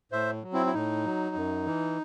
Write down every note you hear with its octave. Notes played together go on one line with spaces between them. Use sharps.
A2 C5 E5
F#3
C4 E4
E4
A2 D#4
F#3
F#2
E3